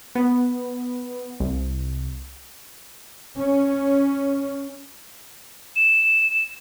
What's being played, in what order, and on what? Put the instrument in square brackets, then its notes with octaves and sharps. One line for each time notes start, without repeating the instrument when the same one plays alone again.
[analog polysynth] B3
C2
[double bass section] C#4
[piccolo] E7